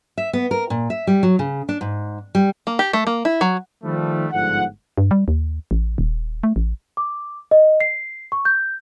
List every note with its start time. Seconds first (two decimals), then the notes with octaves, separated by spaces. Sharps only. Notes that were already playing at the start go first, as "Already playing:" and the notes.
0.18 E5
0.33 B3
0.51 A#4
0.70 A#2
0.90 E5
1.07 G3
1.23 F#3
1.39 C#3
1.69 D4
1.81 G#2
2.35 G3
2.67 A#3
2.79 G4
2.93 A3
3.07 A#3
3.25 E4
3.41 F#3
3.84 D#3 F3 G3 A3
4.32 G1 G#2 D3 F3 F#5
4.98 G2
5.11 G3
5.28 D#2
5.71 A1
5.98 D#1
6.43 A3
6.56 A1
6.97 D6
7.51 D#5
7.80 C7
8.32 C#6
8.45 G6